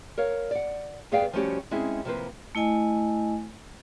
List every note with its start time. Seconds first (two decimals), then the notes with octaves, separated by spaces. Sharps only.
0.18 A#4 C#5 F5
0.51 D5 F#5
1.12 G2 B3 G#4 D5 F5 G5
1.33 F3 G3 A3 C#4 F#4 G4
1.71 G#3 C4 C#4 E4 G#4
2.05 C3 F3 A#3 E4 B4 C5
2.55 A3 E4 D#5 G#5